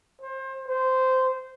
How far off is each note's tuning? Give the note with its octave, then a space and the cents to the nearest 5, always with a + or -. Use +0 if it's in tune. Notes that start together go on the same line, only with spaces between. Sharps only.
C5 +30
C5 -15